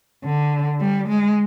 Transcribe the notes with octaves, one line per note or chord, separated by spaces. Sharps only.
D3
G3
G#3